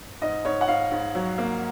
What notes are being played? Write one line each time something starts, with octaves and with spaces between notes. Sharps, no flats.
G#2 D#5
G#2 C#5
F#5
G#2 F5
G#2
F#3
A#3